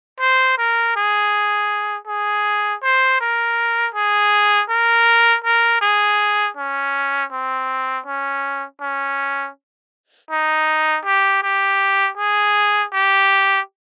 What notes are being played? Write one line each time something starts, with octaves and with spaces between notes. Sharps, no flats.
C5
A#4
G#4
G#4
C5
A#4
G#4
A#4
A#4
G#4
C#4
C4
C#4
C#4
D#4
G4
G4
G#4
G4